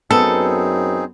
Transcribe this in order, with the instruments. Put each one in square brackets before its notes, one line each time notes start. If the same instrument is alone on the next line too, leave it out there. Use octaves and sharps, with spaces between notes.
[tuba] F#2 [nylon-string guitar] B3 [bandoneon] C4 D#4 G#4 [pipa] A4